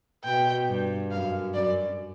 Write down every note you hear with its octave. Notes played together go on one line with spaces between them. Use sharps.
B2 G5
G2
F#2 F5
F#2 D5